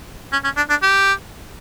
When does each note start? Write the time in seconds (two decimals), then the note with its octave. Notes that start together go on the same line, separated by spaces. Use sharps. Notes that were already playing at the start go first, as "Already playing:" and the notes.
0.32 C#4
0.44 C#4
0.57 D4
0.70 D4
0.82 G4